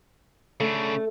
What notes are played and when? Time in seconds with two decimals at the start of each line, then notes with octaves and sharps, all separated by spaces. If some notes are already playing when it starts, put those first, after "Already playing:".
0.60 C#3 A3 D4